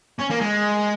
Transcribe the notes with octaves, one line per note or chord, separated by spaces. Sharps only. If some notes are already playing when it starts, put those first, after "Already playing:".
C#4
A#3
G#3